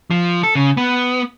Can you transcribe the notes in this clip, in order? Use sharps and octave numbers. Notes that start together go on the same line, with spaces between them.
F3
A4
C#3
B3